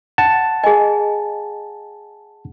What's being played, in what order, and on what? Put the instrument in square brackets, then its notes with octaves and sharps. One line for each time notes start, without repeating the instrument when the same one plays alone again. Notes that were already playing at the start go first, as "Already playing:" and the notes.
[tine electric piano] F#5 A5
[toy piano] G#4 D#5 [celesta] G#5